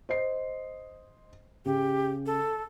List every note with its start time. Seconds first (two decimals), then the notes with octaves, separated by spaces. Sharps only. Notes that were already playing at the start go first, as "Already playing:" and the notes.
0.09 C5 D#5 C7
1.65 C#3 G4
2.26 A4